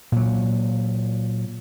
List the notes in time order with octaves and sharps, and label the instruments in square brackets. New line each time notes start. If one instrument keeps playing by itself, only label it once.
[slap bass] A#2 F#3